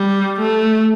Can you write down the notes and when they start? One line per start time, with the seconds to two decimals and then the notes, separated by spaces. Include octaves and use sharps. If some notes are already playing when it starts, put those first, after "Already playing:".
Already playing: G3
0.39 A3